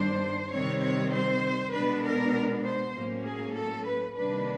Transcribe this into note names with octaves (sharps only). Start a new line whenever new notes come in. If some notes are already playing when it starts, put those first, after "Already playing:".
Already playing: G2 D#3 G3 B3 D4 C5
C3 D#3 G3 C4 C#5
C#5
C5
B2 G#3 B3 D4 B4
A#4
C5
A2 F#3 A#3 C#4
G#4
A4
B4
C3 D#3 G3 A#3 D4 B4